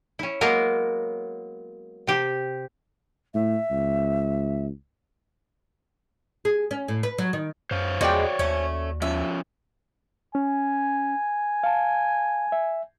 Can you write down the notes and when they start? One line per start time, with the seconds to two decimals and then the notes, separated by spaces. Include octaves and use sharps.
0.19 C#4 E4
0.41 F#3 G#3 A#3 B3 A#4
2.07 C3 G4
3.34 A2 E5
3.71 C#2
6.45 G#4
6.71 C#4
6.88 A2
7.03 B4
7.18 F#3
7.33 D#3
7.71 F#2 C5 C#5 F5
8.01 E2 F3 G#3 B3 F#4 D5 G5
8.39 D#2 A3 C#4
9.02 F3 C#4 E5
10.35 C#4 G#5
11.64 F5 A5
12.52 E5